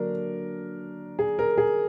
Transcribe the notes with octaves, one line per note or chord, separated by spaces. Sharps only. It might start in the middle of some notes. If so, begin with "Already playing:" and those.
Already playing: D3 F#3 A#3 D4 A#4
G#4
A#4
G#4